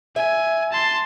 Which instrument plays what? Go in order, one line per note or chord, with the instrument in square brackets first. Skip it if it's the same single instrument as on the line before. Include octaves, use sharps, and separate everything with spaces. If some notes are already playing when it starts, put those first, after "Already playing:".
[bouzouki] E5 [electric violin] G#5
[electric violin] A5 C6